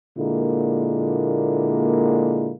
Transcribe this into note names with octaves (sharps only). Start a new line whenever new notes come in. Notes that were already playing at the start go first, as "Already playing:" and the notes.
A#2 D3 G#3 A#3 E4